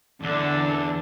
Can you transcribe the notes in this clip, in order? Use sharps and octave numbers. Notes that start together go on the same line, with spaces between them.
E2 D3 D4 A4